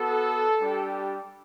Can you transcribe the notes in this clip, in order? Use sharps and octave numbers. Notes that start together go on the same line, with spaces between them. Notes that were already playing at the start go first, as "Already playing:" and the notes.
Already playing: B3 F#4 A4
G3 D4 G4